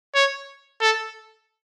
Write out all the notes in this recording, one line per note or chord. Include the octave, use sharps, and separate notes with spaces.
C#5
A4